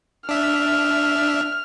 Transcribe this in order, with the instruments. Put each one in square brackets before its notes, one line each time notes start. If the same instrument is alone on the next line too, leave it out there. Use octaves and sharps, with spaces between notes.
[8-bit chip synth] D4 E5 [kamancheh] F6